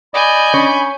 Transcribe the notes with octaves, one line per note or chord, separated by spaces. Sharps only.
D5 D#5 G#5 B5 G6
C#4